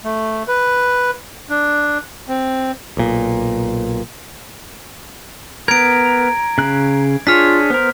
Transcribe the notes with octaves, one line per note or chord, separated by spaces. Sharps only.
A3
B4
D4
C4
B1 A#2
B3 A#4 A#5 G#6 D7
C#3 F#6
D4 F4 G#4 C#5 F6 B6
B3 A#4 C5